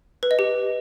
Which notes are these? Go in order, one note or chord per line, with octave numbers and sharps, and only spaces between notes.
B4
D#5
G4